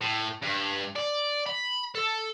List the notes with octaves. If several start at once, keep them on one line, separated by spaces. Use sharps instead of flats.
A2
G2
D5
B5
A4